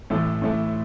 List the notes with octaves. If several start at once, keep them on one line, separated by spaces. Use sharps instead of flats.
A1 A2 A3 E4 A4
A1 A2 A3 E4 A4